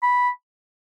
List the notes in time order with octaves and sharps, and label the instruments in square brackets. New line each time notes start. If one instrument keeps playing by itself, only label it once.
[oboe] B5